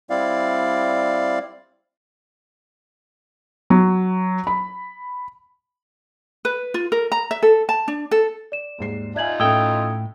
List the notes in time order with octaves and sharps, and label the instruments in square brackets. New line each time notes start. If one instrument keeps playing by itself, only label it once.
[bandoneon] G3 C4 E4 D5 F5
[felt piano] F#3
B5
[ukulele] B4
F4
A#4
A#5
E5
A4
A5
D4
A4
[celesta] D5 E7
[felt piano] D#2 G#2 C7
[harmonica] D#4 F4 [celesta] D5 G#6 F#7 [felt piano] E5 G#5
[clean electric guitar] A2 G5 [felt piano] C#4 A4 E5 [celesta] D#6 E6 G#6